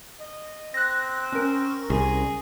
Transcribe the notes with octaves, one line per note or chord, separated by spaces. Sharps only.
D#5
C4 F#6 A#6
C#4 A#4
C2 G#4